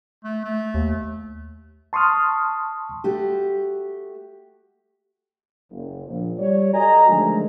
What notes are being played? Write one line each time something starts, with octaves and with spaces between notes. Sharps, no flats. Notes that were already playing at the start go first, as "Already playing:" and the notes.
A3
A3
D#2
A5 C6 C#6 D#6 F6
A3 F#4 G4
F#1
A#1
G3 C#5 D5
F#4 A4 D#5 G#5 A#5
D3 D#3 F3 F#3 G#3 A3